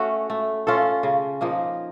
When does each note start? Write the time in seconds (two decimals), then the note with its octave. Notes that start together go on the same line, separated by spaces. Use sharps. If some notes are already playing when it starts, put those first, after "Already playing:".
Already playing: A3 C#4 F#4
0.30 A3
0.67 C#4 F4 A4
1.03 C#3
1.41 F3 A#3 D#4